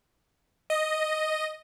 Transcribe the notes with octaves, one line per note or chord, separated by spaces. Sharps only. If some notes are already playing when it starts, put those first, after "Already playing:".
D#5